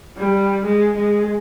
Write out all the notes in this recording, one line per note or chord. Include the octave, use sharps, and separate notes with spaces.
G3
G#3
G#3